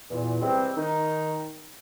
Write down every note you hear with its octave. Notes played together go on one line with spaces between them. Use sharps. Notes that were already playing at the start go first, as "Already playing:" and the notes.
E2 A#2
C3 E3 G3 G#3 C4
D#3 D#4